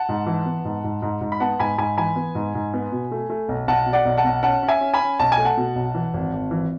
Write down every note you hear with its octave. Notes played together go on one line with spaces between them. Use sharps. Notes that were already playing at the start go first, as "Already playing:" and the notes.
Already playing: F#5 A5
G#2
E3
B3
G#2
G#2
G#2
G#2
B5
B3 F#5 A5
G#2 G#5 B5
G#2 G#5 B5
E3 G#5 B5
B3
G#2
G#2
B3
B2
A3
A3
B1
B1 F#5 A5
B2
D5 F#5
B1
F#5 A5
B1
C#4 F#5 A5
C#4
E5 G#5
C#4
G#5 B5
C#4
B1 A5
G#5
A3
F#5 A5
B2
B1
E3
G#1
G#1
E3